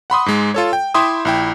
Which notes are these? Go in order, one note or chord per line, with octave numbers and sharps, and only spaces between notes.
F#5 B5 C6 D#6
G#2 G#3
F4 A4 C#5
G5
E4 E5 G5 C6 D6 D#6
A#1 E4 G5